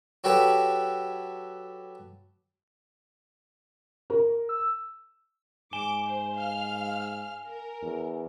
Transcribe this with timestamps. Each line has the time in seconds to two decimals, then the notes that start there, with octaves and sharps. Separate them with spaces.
0.24 F#3 F#4 G4 A4 B4 C#5
4.10 A#4
4.49 E6
5.73 G#2 G#5 D6 E7 G7
6.05 C5
6.37 F5 F6
7.48 A#4
7.82 E2